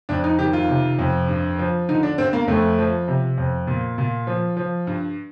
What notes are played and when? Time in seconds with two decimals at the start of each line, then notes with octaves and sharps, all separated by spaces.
0.09 F2 D4
0.24 D#4
0.39 D#3 G4
0.53 F4
0.69 C3
0.99 F2
1.28 G2
1.59 F3
1.88 D3 D#4
2.03 D4
2.18 G2 C4
2.33 A#3
2.48 F2 A3
2.79 F3
3.08 C3
3.38 F2
3.67 A#2
3.98 A#2
4.27 F3
4.57 F3
4.87 G2